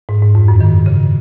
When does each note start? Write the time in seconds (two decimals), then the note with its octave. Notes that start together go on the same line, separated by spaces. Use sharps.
0.09 G#2
0.22 G#2
0.35 F2
0.48 F#2
0.60 D#3
0.86 C#3